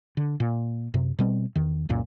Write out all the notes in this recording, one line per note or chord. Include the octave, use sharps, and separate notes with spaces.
D3
A#2
F#2 C3
B2 G3 C4
E2 D#3
C#2 F#2 A#2